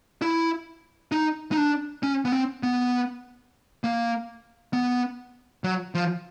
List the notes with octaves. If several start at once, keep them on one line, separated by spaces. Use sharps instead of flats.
E4
D#4
D#4
D4
C#4
B3
C4
B3
A#3
B3
F#3
F3